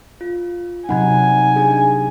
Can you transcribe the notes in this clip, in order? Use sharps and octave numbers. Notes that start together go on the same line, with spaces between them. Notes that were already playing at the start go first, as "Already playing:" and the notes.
F4
C3 F#3 D#4 F#5 G#5 B5 G#6
D4 G4 G#4